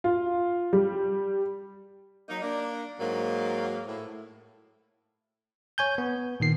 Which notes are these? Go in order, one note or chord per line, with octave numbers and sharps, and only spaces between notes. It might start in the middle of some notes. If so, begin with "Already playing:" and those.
F4
G3
F#3 A#3 D#4
A#3 D4
G#2 F#3 A#3
A2
C#5 G#5 G6
B3
A#2 D#3 C7